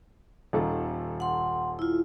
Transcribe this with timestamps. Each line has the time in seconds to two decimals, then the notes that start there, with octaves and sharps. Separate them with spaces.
0.53 D#1 D#3 A4
1.20 F#5 C6
1.79 E4 F4